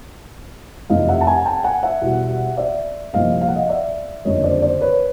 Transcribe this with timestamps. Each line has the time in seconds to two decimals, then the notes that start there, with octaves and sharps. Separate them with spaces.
0.90 F1 F2 C3 E3 D#5 F5
1.09 E5 F#5
1.21 A5
1.27 F#5 G#5
1.46 G5 A5
1.64 F#5 G#5
1.83 E5 F#5
2.02 E2 B2 G3
2.57 D5 E5
3.13 C2 A#2 F3 D#5 F5
3.41 F5
3.48 F#5
3.55 D#5 F5
3.69 D5 E5
4.25 F#1 F2 D3 G3 C#5 D#5
4.44 C5 D5
4.62 C5 D5
4.81 B4 C#5